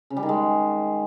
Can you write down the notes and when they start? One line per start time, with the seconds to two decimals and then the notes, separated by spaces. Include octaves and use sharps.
0.10 C#3
0.17 G3
0.23 D#3
0.29 G#3